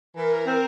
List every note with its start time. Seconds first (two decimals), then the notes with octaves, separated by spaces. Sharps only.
0.15 E3 A#4
0.45 C4